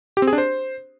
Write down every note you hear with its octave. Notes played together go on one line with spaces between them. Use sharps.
G4
C4
G#4
D4
C5